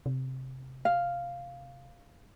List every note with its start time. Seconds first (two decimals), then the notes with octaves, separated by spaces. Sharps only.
0.06 C3
0.85 F5